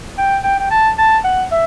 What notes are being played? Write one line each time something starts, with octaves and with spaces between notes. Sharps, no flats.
G5
G5
G5
A5
A5
F#5
E5